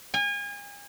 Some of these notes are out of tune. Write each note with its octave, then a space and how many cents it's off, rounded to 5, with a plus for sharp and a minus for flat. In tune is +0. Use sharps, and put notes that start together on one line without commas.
G#5 -35